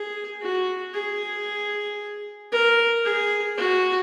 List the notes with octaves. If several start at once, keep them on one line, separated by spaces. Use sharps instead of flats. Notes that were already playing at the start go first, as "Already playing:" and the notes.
Already playing: G#4
F#4
G#4
A#4
G#4
F#4